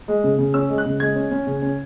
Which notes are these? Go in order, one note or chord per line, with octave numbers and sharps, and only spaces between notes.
G#3
C#3
C#3
C#4 E6
G#3
F#6
C#3
G#3 G#6
C#4
C#4
C#3
C#4